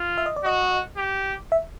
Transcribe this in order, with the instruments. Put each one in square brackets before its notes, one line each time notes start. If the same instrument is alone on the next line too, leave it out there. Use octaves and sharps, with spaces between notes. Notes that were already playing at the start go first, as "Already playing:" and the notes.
Already playing: [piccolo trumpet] F4
[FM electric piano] E5
D#5
D5
[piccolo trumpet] F#4 [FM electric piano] D#5
[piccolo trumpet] G4
[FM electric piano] E5